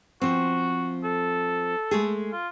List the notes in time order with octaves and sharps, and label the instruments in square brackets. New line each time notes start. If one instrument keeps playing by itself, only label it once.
[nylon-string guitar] F3 C4 [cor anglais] F#4
[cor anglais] A4
[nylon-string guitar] G#3 A3 G#4
[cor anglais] F4